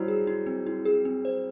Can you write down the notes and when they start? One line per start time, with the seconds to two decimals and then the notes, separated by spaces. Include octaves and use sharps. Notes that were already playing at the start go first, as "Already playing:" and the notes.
Already playing: F#3 G3 E4 C5
0.08 G#4
0.27 E4
0.47 C4
0.66 E4
0.85 G#4
1.05 C4
1.25 C5